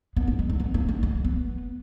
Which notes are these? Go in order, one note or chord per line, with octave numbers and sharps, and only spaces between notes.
B3
A#3
G#3
A3
B3
A#3
A3
A#3
B3